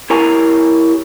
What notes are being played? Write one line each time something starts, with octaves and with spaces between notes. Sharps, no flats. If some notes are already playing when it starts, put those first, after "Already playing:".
E4 G4 A#4 C#5 G#5 A#5